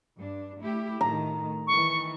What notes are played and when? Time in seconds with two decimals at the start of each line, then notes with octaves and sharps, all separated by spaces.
0.16 G2 D4
0.60 A3 E4 G4
1.01 A2 D#3 A#5
1.67 D#3 E3 C#6